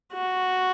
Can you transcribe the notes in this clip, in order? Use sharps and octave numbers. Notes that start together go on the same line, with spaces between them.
F#4